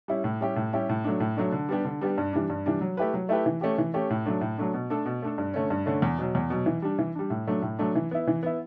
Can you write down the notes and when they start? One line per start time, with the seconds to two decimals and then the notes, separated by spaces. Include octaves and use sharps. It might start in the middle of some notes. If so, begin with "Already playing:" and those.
0.08 G3 C#4 E4
0.24 A2
0.41 G3 C#4 E4 G4
0.56 A2
0.73 G3 C#4 E4 G4
0.89 A2
1.04 F#3 A3 D4
1.20 A2
1.37 F#3 A3 D4
1.52 D3
1.69 G3 B3 D4 G4
1.85 D3
2.01 G3 B3 D4 G4
2.18 G2
2.33 E3 G3 D4
2.50 G2
2.66 E3 G3 D4
2.81 F#3
2.97 A3 E4 G4 B4
3.14 F#3
3.29 A3 E4 G4 B4
3.46 E3
3.61 A3 C#4 G4
3.78 E3
3.94 A3 C#4 G4
4.10 A2
4.26 F#3 A3 D4
4.41 A2
4.58 F#3 A3 D4
4.74 B2
4.90 A3 D4 A4
5.05 B2
5.22 A3 D4 A4
5.38 G2
5.54 D3 A3 C#4
5.70 G2
5.86 D3 A3 C#4
6.02 E2
6.18 B2 F#3
6.35 E2
6.50 B2 F#3
6.66 E3
6.82 G3 D4
6.99 E3
7.15 G3 D4
7.30 A2
7.47 F#3 A3 D4
7.62 A2
7.79 F#3 A3 D4
7.95 E3
8.11 B3 E4
8.27 E3
8.43 B3 E4